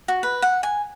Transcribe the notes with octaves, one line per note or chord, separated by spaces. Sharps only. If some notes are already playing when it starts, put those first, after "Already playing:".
F#4
B4
F#5
G#5